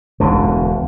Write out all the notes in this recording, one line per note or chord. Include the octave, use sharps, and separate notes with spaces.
E1 C#2 B2 D3